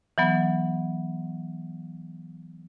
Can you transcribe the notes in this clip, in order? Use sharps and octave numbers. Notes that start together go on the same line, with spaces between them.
E3 F#3 B3